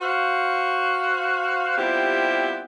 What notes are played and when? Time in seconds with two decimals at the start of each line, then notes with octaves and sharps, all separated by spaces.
0.02 F#4 C5 F5
1.78 G3 B3 C4 E4 F4 G4